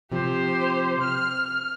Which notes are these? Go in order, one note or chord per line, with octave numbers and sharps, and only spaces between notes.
C3 F3 G4 C5
C4 F6